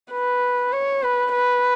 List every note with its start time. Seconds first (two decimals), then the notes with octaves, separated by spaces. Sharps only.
0.12 B4
0.72 C#5
1.03 B4
1.32 B4